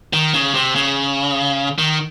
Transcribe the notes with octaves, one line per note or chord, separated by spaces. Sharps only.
D#3
C#3
C3
C#3
D#3